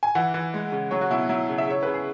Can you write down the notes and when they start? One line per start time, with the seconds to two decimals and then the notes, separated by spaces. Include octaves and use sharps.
0.03 G#5
0.15 E3 F#5
0.34 E3
0.54 G#3
0.72 C#3
0.91 F#3 C#5
1.01 F#4
1.10 B2 E4
1.29 F#3 E4
1.49 C#3
1.58 E5
1.68 C#3 C#5
1.83 C#3 B4
1.94 G#4